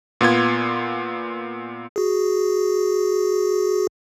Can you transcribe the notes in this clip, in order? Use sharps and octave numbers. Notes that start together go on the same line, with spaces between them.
A#2 B3 F4 G#6
F#4 G#4